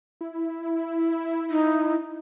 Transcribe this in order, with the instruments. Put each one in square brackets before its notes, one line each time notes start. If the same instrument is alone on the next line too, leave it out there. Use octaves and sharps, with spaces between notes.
[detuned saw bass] E4
[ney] D#4